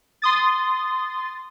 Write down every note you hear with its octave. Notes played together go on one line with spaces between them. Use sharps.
C6 D#6 A6